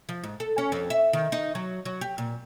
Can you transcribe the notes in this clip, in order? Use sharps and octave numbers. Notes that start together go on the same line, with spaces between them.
F3
G#2
A4
C#4
F2
E5
D#3
D#4
F#3
F#3
G4
A#2